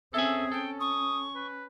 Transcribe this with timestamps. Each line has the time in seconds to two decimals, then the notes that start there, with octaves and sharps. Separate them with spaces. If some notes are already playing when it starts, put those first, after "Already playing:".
0.14 C4 C#4 G#4 A4 E5 G#5
0.52 C#4 A4 G5
0.80 C#6 D#6
1.35 B4